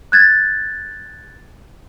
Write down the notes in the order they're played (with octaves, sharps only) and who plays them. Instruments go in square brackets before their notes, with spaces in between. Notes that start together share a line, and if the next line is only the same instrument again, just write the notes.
[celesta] F#6 G#6 A6